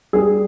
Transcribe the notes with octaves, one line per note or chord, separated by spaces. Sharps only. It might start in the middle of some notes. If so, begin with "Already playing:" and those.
G3 G#4